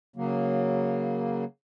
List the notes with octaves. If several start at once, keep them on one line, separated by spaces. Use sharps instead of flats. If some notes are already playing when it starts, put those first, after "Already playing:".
C#3 F#3 A#3